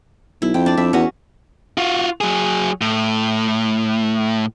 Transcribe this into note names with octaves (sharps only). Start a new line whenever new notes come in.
B1 E4
F2 G5
D4 D5
F2 E5
E2 C#4 F#4
F4 F#4
F#3 G#4
A2